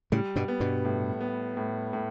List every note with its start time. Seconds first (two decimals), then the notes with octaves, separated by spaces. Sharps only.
0.12 A2 C#3 G3
0.36 G2 B2
0.48 B3
0.60 G2 B2
0.84 A2
1.21 B3
1.57 A2
1.93 A2